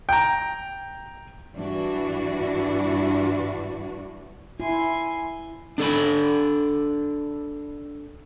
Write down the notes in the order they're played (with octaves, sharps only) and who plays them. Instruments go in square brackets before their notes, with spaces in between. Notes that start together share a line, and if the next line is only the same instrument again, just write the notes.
[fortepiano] G5 A#5
[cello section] G2 E3 D4 F#4
[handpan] E4 [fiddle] G#5 C6
[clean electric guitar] D4 A4 D5 B5